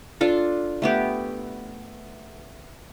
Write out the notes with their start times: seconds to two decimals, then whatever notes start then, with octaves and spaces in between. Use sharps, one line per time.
0.21 D4 F4 A4
0.82 A3 B3 G4